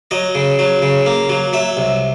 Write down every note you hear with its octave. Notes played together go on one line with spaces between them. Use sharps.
F#3 D#5
C#3
F#3
C#3
A#3
F#3
F#3 E5
C2